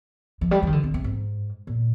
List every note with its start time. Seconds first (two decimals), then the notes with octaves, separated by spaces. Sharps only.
0.41 F3
0.51 G3
0.63 F3
0.67 D#3
0.73 D3
0.83 C3
0.94 C3
1.04 G#2
1.67 A#2